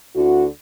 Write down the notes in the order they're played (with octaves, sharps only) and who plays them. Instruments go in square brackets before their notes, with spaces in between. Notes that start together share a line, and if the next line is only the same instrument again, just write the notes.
[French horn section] D2 D3 E4 F#4